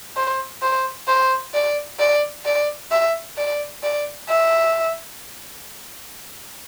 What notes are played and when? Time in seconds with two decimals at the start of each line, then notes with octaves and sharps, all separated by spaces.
0.17 C5
0.62 C5
1.08 C5
1.54 D5
1.99 D5
2.45 D5
2.91 E5
3.37 D5
3.83 D5
4.29 E5